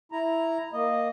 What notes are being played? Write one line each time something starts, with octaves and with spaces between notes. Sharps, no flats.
E4 A#5
A#3 D#5